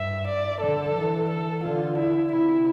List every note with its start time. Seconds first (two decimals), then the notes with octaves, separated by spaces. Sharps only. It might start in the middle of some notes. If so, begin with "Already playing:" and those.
Already playing: G2 E5
0.27 D5
0.61 D3 A4
0.95 E3
1.29 A4
1.63 D3 F4
1.98 E4
2.32 C3 E4